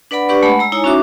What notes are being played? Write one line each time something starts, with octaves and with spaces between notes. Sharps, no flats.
D4 B4 D5 F#5 B5
D4 G4 B4 D5 C#6
G#3 A3 F#5 B5
G#3 A#5 E6
D#4 E4 C#5 G#5 A#5
C#4 D#4 F#4 E5 D6